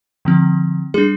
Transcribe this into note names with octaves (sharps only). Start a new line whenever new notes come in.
D3 F3 C4
G3 D4 G#4